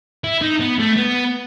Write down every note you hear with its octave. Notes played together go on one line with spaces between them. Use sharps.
E4
D#4
B3
A3
B3